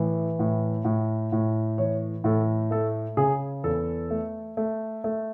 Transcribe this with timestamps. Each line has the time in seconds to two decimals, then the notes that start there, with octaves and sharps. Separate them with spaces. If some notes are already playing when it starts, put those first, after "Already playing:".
Already playing: A2 E3
0.39 A2
0.85 A2
1.32 A2
1.78 E3 C#5
2.24 A2 A4
2.71 A3 A4
3.17 C#3 G#4
3.64 E2 A4
4.11 A3
4.57 A3
5.04 A3